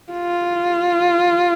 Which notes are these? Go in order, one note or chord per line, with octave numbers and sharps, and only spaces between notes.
F4